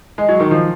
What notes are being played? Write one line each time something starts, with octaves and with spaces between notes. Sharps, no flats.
G#3
F#3
D#3
F3